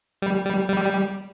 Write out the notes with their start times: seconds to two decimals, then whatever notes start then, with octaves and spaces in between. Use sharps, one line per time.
0.22 G3
0.46 G3
0.69 G3